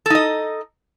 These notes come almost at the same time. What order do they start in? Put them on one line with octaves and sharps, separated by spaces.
A4 D#4 D#5